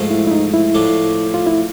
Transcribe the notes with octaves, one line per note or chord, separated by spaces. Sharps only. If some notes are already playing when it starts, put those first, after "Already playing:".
Already playing: G#2 F3 A3
E4
E4
D#4
E4
A2 F3 A3 D4
F4
E4